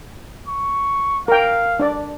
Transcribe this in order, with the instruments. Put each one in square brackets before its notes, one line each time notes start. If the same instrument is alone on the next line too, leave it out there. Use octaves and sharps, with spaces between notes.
[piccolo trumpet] C#6
[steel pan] A#4 G5 [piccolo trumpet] F5
[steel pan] D4 D5